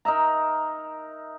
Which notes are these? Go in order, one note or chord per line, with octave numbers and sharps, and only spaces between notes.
D#4 A#4 E5 A#5